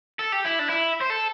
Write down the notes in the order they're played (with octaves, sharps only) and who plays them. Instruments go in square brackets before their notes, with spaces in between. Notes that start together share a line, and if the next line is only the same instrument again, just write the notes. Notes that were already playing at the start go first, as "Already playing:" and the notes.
[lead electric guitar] A4
G4
E4
D4
E4
C5
A4